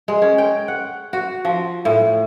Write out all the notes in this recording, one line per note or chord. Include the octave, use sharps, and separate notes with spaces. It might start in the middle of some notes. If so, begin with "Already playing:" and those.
G#3
C#4
G5
F#5
F#4
F3
A2